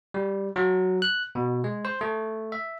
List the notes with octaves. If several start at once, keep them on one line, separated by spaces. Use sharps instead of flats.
G3
F#3
F#6
B2
G#3
C5
A3
E5